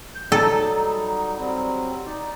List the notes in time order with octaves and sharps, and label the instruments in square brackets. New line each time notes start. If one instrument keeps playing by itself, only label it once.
[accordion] G6
[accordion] F#3 G3 D#4 [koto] A4
[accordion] F#3 G3 C4
D#4 D5